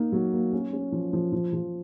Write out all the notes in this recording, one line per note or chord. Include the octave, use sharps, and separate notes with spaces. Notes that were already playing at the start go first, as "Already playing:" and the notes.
Already playing: A#3 D#4
F#3
A#3
C#4
C#4
F3
F3
F3
F3